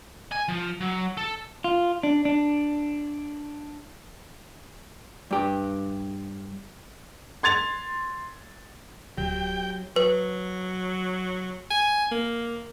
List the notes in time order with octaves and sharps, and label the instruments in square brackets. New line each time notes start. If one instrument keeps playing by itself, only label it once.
[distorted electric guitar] G#5
F3
F#3
A4
[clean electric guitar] F4
D4
D4
[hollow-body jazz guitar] G2 G4
[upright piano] C6 G#6 A6 F7
[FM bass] D1 [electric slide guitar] F#3 [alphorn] G4 [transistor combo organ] G5
[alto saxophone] F#3 [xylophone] B4
[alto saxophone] G#5
A#3